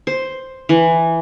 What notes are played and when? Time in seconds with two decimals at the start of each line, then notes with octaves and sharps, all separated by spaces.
0.07 C5
0.69 E3